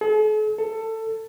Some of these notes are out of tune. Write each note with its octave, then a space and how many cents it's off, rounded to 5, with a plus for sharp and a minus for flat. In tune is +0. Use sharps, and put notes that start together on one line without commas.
A4 -45
A4 +20